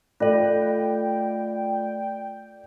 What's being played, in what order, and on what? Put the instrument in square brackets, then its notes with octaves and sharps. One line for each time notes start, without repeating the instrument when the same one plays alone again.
[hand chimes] A3 F4 [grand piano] A4 D5 [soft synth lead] G5